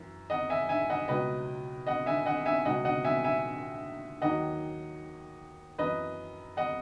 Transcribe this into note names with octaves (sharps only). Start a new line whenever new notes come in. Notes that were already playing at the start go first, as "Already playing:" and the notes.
Already playing: F#2 E3
D#5 F#5
E5 G#5
E5 G#5
D#5 F#5
C#2 B2 F#3 B4 D#5
D#5 F#5
E5 G#5
D#5 F#5
E5 G#5
C#2 B2 F#3 D#5 F#5
D#5 F#5
E5 G#5
E5 G#5
D#2 D#3 F#3 D#5 F#5
F#2 E3 B4 D#5
D#5 F#5